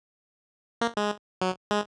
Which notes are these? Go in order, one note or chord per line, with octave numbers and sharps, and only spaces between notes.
A#3
G#3
F#3
G#3